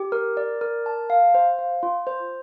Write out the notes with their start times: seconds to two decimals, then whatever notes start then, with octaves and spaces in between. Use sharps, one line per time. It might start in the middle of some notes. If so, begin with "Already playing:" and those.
Already playing: G4
0.12 A#4
0.37 D5
0.61 A#4
0.86 A5
1.10 F5
1.34 C5
1.59 F5
1.83 F4
2.07 C5